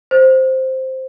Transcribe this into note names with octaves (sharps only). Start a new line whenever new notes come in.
C5